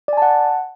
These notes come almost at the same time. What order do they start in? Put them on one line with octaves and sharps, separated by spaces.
D5 G#5 A5 F#5